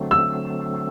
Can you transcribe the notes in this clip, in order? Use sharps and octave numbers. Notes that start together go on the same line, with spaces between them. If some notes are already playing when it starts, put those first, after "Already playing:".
Already playing: D3 F#3 A3 C4
E6